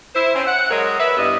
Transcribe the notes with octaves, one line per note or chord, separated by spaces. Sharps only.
E4 C5
C4 C#4
F#5
F#3 G#3 A#4 C#5 D#5
B4 E5
G2 G3 B3 E4 D#5